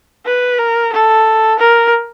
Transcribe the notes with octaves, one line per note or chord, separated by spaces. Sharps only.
B4
A#4
A4
A#4